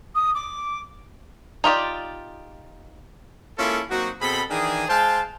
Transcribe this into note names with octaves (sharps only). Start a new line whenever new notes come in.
D#6
D6
D#4 F4 G4 D5
G#3 A#3 C#4 E4 F4 A4
F#3 A#3 C4 D#4 F#4
B2 C4 G#4 A4 B5
D#3 E3 D4 G#4
G#3 C5 F5 G5 A5